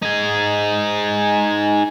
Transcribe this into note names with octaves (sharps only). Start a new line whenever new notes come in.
D#4 G#4